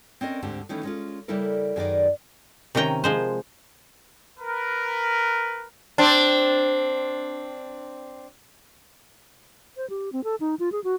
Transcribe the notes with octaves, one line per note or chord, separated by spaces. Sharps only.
C4 C#4 A#4 D#5
D2 G#2 D3 C4 G4
D#3 E3 A3 C#4
G#3 C#4 F4
C#3 G3 A#3 E4 A4 A#4
F#2 D#3 G#4 A#4 B4 D5
C3 D#3 C#4 G5 A#5
F3 G#3 C5
A#4 B4
C4 D4
C5
G4
C4
A4
D#4
F4
G#4
F#4